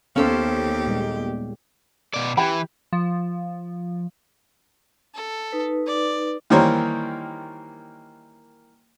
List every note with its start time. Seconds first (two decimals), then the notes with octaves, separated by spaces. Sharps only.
0.16 D#2 B3 C#4 G4 A4 C5 C#5 F5
0.87 A#2 G3 G#3
2.14 B2 D5
2.37 E3 G4 B5
2.93 F3
5.14 A4
5.52 D#4 B4
5.87 D5
6.50 D#3 E3 G3 A#3 C5 C#5